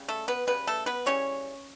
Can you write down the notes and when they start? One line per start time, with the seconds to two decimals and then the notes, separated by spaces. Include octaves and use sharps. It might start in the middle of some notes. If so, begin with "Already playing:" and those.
Already playing: C#3 G3
0.08 A3 A4
0.28 B3 B4
0.47 C#3 G3 B3 B4
0.67 A3 A4
0.86 B3 B4
1.06 C#3 E3 G3 C#4 C#5